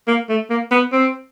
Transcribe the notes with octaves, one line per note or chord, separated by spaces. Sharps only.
A#3
A3
A#3
B3
C4